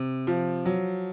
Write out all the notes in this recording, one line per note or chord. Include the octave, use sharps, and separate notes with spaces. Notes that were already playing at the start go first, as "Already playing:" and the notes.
Already playing: C3
F3
F#3